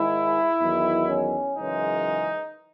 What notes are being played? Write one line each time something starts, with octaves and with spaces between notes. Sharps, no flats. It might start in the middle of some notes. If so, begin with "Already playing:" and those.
Already playing: G#2 D#3 G#3 E4
E2 D#3 F#3
C#4
F#2 C#3 E3 G#3 D#4